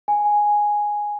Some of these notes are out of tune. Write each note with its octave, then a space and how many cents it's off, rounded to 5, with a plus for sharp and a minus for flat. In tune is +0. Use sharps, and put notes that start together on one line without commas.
G#5 +0